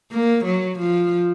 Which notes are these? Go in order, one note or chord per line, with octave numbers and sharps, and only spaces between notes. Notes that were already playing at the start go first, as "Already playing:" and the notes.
A#3
F#3
F3